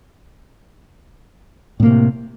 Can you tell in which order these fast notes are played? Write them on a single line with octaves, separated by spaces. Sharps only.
A2 A#3 C3